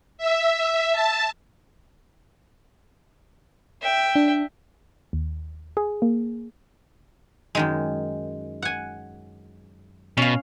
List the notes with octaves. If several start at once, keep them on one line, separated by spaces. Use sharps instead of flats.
E5
A5
E5 G5
D4
D#2
G#4
A#3
F#2 D#3 G#3
F#5 G#5
B2 C#4 F5